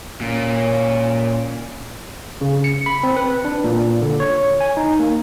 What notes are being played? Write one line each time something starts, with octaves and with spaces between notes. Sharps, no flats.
A#2 C#4
C#3
C#7
B5
C4
B4
D4
A#2
D3
C#5
G#5
D#4
A#3